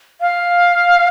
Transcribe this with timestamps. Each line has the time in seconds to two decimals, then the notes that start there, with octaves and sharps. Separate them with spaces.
0.21 F5